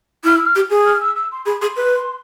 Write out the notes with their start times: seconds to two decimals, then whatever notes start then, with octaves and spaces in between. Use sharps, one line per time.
0.24 E4 F6
0.35 E6
0.45 F6
0.55 G4
0.70 G#4
0.86 F6
1.00 E6
1.16 E6
1.31 C6
1.46 G#4 B5
1.61 G#4 C6
1.76 B4